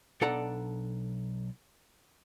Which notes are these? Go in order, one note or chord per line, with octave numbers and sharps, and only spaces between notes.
B1 D4 A4 D5 F#5 A#5